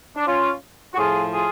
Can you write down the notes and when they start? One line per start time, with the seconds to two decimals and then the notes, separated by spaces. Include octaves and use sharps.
0.16 D4
0.27 C#4 F4
0.93 F#4
0.98 A2 F3 F4 G#4
1.34 F4 G#4